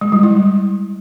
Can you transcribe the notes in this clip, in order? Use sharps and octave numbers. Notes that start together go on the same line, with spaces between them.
G#3
G3
E4